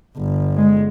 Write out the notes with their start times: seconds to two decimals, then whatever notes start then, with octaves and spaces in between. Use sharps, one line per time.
0.18 G1
0.57 G#3